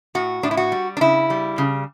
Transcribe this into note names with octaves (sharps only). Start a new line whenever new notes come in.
A2 F#4
A2 D4
E4
F#4
G3
D4
C#3 E4
G3
C#3